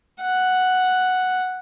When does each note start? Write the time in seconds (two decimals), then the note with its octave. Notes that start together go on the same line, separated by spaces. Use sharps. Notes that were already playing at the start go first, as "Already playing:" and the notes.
0.21 F#5